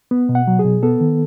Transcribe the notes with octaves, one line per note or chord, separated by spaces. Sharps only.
B3
B2
F#5
F#3
G#4
B2
B3 A4
D#3